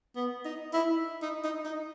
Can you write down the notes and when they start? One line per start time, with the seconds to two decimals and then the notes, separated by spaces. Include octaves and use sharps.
0.16 B3
0.45 D#4
0.73 E4
1.22 D#4
1.44 D#4
1.65 D#4